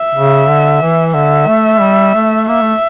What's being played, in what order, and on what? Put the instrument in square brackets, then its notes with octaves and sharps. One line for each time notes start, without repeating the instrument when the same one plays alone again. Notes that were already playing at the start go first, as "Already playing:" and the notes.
Already playing: [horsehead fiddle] E5
[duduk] C#3
D3
E3
[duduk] D3 [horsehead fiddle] E5
[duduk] A3
G3
A3
[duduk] A#3 [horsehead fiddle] E5
[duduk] A3